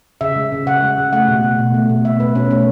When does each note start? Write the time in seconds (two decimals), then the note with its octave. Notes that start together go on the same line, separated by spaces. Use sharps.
0.21 C#3 E5
0.36 G#3
0.52 C#3
0.67 C#3 F#5
0.82 G#3
0.98 C#3
1.13 A3 F#5
1.28 B2
1.43 B2
1.59 B2
1.74 A3
1.89 B2
2.04 A3 E5
2.20 B2 B4
2.35 B2 C#4
2.51 A3 C#4